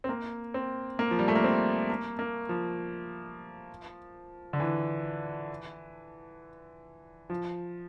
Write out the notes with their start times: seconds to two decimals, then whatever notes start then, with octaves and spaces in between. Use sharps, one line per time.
0.04 C4
0.09 A#3
0.54 C4
0.99 A#3
1.11 F3
1.19 G3
1.28 A3
1.36 A#3
1.44 C4
1.90 A#3
2.19 A#3
2.49 F3
4.53 D3
4.60 E3
7.30 F3